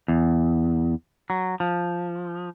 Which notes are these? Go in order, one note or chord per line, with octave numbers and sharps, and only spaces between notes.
E2
F#3
F3